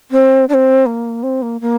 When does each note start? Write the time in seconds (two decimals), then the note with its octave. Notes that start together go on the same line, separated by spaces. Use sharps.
0.11 C4
0.49 D4
0.54 C4
0.86 A#3
1.23 C4
1.42 A#3
1.61 A#3